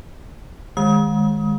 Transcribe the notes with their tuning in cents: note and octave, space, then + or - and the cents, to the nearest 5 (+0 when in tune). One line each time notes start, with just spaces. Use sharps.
D#3 +0 G#3 +0 D#6 +30